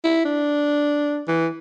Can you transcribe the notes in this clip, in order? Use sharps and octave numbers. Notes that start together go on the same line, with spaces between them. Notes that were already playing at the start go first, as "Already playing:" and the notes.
E4
D4
E3